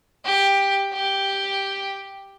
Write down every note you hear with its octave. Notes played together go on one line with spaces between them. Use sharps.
G4
G4